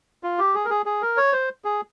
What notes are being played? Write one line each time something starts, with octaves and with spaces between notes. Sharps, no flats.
F4
G4
G#4
A#4
G#4
G#4
A#4
C#5
C5
G#4